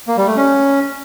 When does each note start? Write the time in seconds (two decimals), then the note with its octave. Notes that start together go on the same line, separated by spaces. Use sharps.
0.08 A#3
0.17 G3
0.27 A3
0.36 C#4